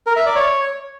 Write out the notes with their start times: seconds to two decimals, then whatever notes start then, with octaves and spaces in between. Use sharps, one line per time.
0.07 A#4
0.16 E5
0.26 D5
0.36 C#5